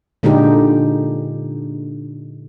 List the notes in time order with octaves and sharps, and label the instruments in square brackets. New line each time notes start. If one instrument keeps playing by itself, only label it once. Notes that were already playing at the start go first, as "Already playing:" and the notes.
[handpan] A#2 D3 G#3 D4 D#4 G4